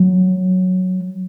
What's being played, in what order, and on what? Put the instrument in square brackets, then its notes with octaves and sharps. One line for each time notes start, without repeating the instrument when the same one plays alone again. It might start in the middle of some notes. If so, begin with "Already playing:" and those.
Already playing: [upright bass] F#3